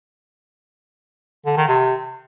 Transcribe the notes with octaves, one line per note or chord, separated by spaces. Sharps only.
D3
D#3
C3